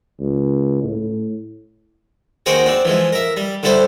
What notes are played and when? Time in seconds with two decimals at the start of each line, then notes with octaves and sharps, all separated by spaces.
0.20 C#2
0.84 A2
2.46 D#2 D#4 F#4 G#4 C5 G5
2.66 C4 D4
2.85 E3 F3 G#3
3.12 A#4 E5
3.37 G3
3.63 D3 G3 E4 A4 C5